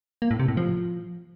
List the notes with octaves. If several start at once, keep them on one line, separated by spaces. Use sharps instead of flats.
A#3
A2
C3
A2
F3